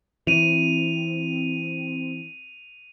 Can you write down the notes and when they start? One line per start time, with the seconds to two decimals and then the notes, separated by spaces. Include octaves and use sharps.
0.27 E3 C4 D#7 F7